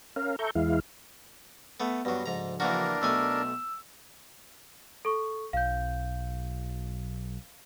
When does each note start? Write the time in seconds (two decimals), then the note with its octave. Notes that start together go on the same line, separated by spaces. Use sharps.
0.16 C#4 A#4 F5
0.39 A4 E5 A#5 C#6 G6
0.55 E2 E3 G#3 E4 F5
1.80 A3 B3
2.05 G2 F#3 B3 F#4
2.26 D2 G#2 C#3 F3 A#5
2.60 E3 A#3 D4 F#4 A#4
3.02 B1 A3 G#5 E6
5.05 A4 C#6
5.53 B1 F5 G6